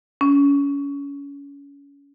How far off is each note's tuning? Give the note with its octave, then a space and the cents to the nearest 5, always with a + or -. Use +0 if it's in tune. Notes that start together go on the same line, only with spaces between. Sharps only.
C#4 +30